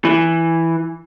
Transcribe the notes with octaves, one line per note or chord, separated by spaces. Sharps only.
E3